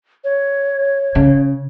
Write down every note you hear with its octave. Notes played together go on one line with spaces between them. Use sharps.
C#5
C#3